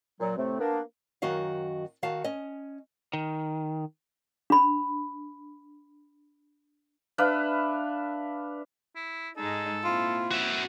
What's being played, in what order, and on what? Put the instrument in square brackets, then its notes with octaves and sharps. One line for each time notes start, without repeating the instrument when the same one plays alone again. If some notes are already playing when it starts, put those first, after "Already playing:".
[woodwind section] A#2 F#3
A2 C3 A3 C4
A#3 B3 D4
[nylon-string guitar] F#2 D#3 F#4 D#5 F5
D#3 F#4 F5 A5
C#4 D#5
[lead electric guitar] D#3
[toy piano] D4 B5
[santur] D4 B4 E5 F5
[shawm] E4
[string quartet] G#2 G#3 D#4 [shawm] A4
[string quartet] A#2 C4 E4 [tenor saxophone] F4
[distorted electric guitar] F#4 E5